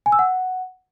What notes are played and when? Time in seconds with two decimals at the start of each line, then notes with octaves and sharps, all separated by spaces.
0.06 G#5
0.12 E6
0.19 F#5